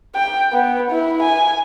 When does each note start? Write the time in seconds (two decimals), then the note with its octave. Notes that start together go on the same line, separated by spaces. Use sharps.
0.16 G5
0.52 B3
0.92 E4
1.23 G#5